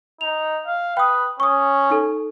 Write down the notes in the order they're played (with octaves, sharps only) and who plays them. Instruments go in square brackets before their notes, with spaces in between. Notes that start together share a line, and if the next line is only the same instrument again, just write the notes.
[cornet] D#4 [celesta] F7
[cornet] F5
[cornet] B4 [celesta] G5 D#6
[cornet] C#4 [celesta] C#6 D#6
[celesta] D#4 A4